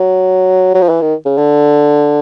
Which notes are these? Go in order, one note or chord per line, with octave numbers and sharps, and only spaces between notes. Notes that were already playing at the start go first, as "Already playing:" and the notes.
Already playing: F#3
F#3
F3
E3
D#3
C#3
D3